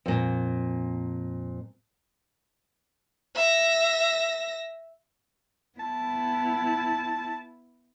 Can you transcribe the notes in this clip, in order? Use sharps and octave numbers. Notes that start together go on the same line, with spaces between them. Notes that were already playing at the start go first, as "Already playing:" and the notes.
F2 A#2
E5 A#6
B3 E4 A5